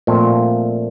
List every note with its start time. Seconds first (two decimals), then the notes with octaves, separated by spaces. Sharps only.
0.07 A#2 F3 A3 C4